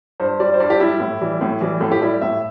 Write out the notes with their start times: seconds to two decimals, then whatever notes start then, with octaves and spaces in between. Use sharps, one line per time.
0.20 G2 C5
0.40 G3 D5
0.54 C5
0.60 G2 D5
0.70 G4
0.80 G3 E4
1.00 A2
1.21 E3 G3
1.41 A2
1.61 E3 G3
1.81 A2 A4
1.92 G4
2.02 G3 E4
2.21 A2 E5